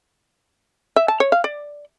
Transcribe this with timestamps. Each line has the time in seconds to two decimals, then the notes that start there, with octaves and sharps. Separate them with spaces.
0.96 E5
1.08 A5
1.20 C#5
1.32 F5
1.44 D5